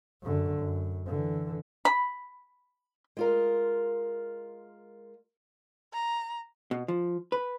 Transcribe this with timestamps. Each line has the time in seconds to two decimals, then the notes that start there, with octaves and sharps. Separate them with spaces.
0.22 F#2 D3
0.58 F#2
1.06 D3 E3
1.85 B5
3.17 G#3 F4 A#4
5.93 A#5
6.71 B2
6.88 F3
7.32 B4